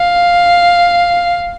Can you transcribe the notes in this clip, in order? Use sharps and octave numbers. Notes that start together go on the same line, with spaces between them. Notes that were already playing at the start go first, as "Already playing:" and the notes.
Already playing: F5